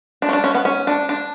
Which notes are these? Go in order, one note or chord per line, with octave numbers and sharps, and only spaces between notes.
D4
C#4
D4
C#4
B3
C#4
D4
D4